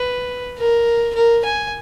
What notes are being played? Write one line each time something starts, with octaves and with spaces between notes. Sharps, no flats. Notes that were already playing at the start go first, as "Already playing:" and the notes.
Already playing: B4
A#4
A#4
G#5